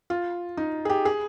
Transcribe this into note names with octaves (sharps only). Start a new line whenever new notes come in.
F4
D#4
G#4
G4
G#4